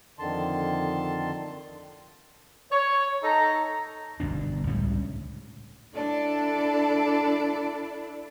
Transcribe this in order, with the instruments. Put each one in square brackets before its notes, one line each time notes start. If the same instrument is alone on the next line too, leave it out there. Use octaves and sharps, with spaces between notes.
[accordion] F2 D3 D#3 A5 C6
[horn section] C#5
D#4 A4 A#5
[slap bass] G1 C2 B2 D4
C#2 A2 G3 C#4
[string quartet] D4 E4 A4 D5 A5